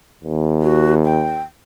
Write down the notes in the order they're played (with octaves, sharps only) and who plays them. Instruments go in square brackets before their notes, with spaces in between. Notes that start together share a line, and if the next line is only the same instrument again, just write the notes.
[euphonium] D#2
[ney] F#4
G5